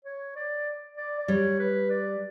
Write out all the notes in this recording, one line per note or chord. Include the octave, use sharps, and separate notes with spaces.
C#5
D5
D5
D5
G3 C#5
B4
D5